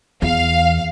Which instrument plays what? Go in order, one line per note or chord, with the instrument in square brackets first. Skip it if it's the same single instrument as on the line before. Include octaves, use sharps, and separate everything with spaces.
[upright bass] E2 [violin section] F5